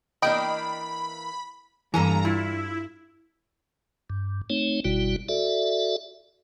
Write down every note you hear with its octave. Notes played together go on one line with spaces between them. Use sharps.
E3 A#3 D4 D#5 G5 B5 D7
G2 E3 A#3 A4 G#5 A#5
E4 F4
G2
A3 C4 D#4 C#5
G1 B2 G3 E4 F#4
F#4 A4 D5 E5